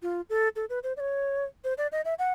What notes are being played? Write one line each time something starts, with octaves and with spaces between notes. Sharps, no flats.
F4
A4
A4
B4
C5
D5
C#5
C5
D5
D#5
E5
F#5